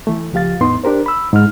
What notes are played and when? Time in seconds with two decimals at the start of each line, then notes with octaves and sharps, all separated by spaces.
0.07 E3 A3
0.33 C#2 F3 G4 F5 A6
0.61 E2 A2 B3 D#4 C6
0.84 D4 G4 A#4 C5
1.06 B5 E6
1.33 G#2 F6